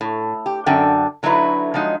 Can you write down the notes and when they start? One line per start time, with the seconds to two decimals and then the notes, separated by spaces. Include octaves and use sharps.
0.01 A2
0.46 G4
0.66 F#2 D3 D4 G5
1.23 D3 F#3 D#4 E4 B4
1.74 F3 F#3 G#3 D#4